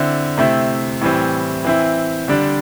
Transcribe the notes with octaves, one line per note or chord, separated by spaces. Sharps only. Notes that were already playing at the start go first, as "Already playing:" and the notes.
Already playing: D3 C4 E4
C3 A3 C4 E4
A2 E3 G3 C4
E3 C4 E4
D3 G3 D4